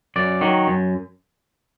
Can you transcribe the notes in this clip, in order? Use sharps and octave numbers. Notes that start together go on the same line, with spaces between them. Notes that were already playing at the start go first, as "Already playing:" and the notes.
F#2 D5
D#3 F#3
F#2